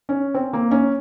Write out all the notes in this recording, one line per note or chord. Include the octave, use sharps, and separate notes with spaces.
C#4
C4
A#3
C#4